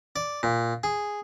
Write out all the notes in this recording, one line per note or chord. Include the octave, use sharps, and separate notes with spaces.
D5
A#2
G#4